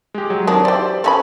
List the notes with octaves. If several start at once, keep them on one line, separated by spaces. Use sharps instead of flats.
G#3 G4
F#3
D#3 C4 D4
E3 G4 C5 D5 G5
C4 C#4 A4 B4 B5